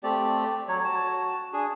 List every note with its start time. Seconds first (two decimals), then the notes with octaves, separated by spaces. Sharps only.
0.03 A3 C4 G4 D5
0.68 F#3 C#5
0.85 F#4 A5
1.53 D4 G#4